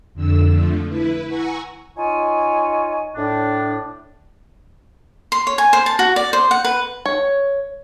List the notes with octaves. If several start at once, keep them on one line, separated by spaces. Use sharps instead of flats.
F2 D3 E6
D3 F3 A3
E4 B4
F#5 G#5 A#5 C#6 E6
D#4 F4 C#5 G#5
A2 D4
C6
C#5
G#5
C5
A5
F#4
D5
C5
F#5
B4
C#5